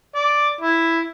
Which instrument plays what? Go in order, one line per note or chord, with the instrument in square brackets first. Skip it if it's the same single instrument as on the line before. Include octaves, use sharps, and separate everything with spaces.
[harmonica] D5
E4